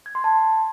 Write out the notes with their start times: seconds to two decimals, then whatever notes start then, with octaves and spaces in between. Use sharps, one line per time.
0.06 G#6
0.15 C6
0.24 A5